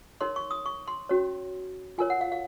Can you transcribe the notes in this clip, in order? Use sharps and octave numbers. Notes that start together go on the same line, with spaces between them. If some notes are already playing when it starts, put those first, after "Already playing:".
D#4 A#4 C#5 C6
C#6
D#6
C#6
C6
C#4 F#4 C#5
F4 A#4 C#5 G#5
F#5
F5
F5